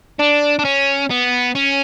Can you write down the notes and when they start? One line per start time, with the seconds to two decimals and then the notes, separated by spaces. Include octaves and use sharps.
0.19 D4
0.59 D4
0.65 C#4
1.10 B3
1.55 C#4